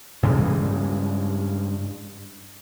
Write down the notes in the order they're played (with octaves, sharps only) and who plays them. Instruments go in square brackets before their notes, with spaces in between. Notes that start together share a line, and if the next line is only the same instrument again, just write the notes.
[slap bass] G2 C#3 E3 G#3